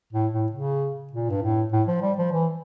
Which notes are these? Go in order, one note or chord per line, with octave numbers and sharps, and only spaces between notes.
A2
A2
C#3
A#2
G2
A2
A2
F3
G3
F3
E3